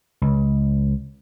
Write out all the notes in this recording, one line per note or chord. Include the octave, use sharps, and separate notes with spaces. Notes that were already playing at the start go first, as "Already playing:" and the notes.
C#2